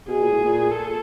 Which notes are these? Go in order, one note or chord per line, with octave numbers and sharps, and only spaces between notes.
B2 G#4
A#2
A2
A#2
A4